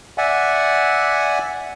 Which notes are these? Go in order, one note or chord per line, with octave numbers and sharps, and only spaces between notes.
D5 E5 F#5 G#5